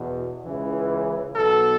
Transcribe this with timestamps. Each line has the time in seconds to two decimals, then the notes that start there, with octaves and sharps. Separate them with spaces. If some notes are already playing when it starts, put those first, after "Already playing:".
Already playing: E2 B2
0.45 C#2 C#3 E3
1.34 B1 B2 A4